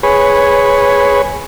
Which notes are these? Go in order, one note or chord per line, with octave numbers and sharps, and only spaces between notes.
G#4 B4 C#5